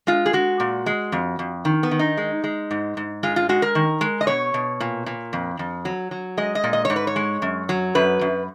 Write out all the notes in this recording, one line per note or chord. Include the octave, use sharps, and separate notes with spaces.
G#3 F4
G#4
G#3 F#4
A#2
G#3
F2
F2
D#3
B3
D#3
D#4
G#3
G#3
G#2
G#2
G#3 F4
F4
G#3 F#4
A#4
D#3
G#3
D#5
B2 C#5
B2
A#2
A#2
F2
F2
F#3
F#3
G#3 D#5
D#5
A#2
D#5
G#2 C#5
B4
C#5
G#3
F#2
F#3
F#2 B4
F#2